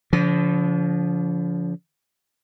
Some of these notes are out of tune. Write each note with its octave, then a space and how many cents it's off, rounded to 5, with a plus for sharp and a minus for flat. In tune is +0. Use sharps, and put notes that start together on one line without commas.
D3 -40 F3 +0